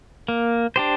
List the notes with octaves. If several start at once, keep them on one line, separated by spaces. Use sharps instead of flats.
A#3
D4 G4 C5